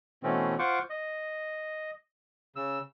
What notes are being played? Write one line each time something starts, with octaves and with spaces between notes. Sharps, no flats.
B2 E3 A3 C4 C#4
F4 C5 F#5 C#6 D6
D#5
C#3 E6